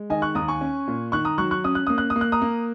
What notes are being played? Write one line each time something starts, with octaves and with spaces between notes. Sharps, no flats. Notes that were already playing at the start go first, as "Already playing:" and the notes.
Already playing: G#3
D#3 D#5 G#5
C#6 F#6
D#2 A#5 D#6
G#5 C#6
C#4
A#2
D#3 C#6 F#6
A#5 D#6
F#3 C#6 F#6
C#6 F#6
C#4 D#6
F#6
A#3 D#6
F#6
D#6
A#3
F#6
A#5 D#6
A#3